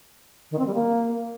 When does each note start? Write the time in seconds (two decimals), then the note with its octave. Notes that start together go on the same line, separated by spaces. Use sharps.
0.51 D#3
0.59 C4
0.66 G3
0.74 A#3